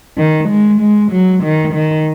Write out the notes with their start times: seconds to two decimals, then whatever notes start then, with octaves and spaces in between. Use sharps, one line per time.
0.17 D#3
0.49 G#3
0.80 G#3
1.11 F#3
1.43 D#3
1.74 D#3